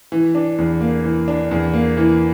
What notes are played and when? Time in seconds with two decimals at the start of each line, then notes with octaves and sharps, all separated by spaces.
0.12 E3
0.35 D4
0.58 E2
0.81 A#3
1.04 E3
1.28 D4
1.51 E2
1.74 A#3
1.97 E3